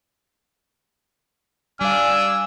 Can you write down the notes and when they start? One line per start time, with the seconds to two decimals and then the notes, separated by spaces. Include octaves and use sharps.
1.81 G3 D4 F5 G#5 E6